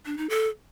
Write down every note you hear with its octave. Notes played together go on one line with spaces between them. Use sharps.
D4
D#4
A4